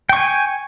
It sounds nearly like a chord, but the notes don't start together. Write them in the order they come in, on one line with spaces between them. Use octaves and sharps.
G5 C#6 G#5